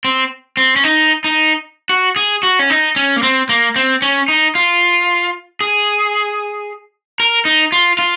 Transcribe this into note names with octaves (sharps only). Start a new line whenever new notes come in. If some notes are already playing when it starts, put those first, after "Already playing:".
C4
C4
C#4
D#4
D#4
F#4
G#4
F#4
C#4
D#4
C#4
A#3
C4
A#3
C4
C#4
D#4
F4
G#4
A#4
D#4
F4
F4